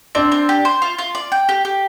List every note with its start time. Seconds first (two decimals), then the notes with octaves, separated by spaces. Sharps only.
0.15 C4 D4 D5
0.32 C4
0.49 G4
0.65 C5
0.82 F4
0.98 F4
1.15 D5
1.32 G5
1.49 G4
1.65 G4